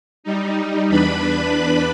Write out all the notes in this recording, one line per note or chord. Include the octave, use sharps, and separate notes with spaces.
G3 D#4
E2 D4 B4 B5